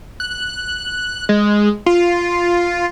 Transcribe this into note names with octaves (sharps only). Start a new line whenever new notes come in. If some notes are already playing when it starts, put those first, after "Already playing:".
F#6
G#3
F4